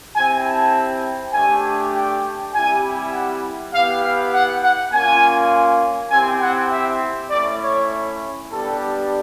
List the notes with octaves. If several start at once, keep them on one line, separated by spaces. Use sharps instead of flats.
C4 E4 G4 G#5
A5
A3 D4 G4 G#5
G5
G3 C4 E4 G4 G#5
F#5
B3 E4 G4 F5
F5
F#5
F#5
A#3 C#4 F4 G#5
C4 E4 G4 G#5
F#5
E5
A3 C#4 E4 D5
C#5
G3 B3 D4 G4 A4